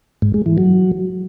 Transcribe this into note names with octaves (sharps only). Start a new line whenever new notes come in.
G#2
G#3
E3
F#3